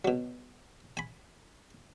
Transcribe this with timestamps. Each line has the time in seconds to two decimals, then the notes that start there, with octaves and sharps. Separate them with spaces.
0.05 B2 F#3
0.97 G#5 B5